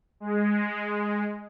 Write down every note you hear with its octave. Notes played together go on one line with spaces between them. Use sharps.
G#3